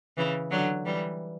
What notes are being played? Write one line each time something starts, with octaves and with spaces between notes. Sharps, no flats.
C#3 E3
D3 F#3
E3 G3